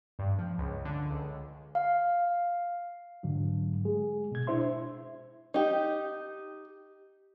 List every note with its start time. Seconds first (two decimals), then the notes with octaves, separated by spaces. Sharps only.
0.19 G2
0.39 F3
0.58 C#2
0.85 D3
1.11 C#2
1.75 F5
3.23 G#2 D3 F#3
3.85 G#3 G#4
4.32 B2 G#6
4.47 D4 E4 C5 E5 C6
5.54 D#4 G4